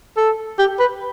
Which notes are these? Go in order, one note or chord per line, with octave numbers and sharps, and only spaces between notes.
A4
G4
B4